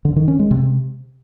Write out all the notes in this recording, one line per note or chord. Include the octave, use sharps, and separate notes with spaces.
D3
D#3
C#4
G#3
C3